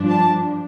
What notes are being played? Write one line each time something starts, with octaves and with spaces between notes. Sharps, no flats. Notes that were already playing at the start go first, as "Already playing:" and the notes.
Already playing: G2 F3 D4
A5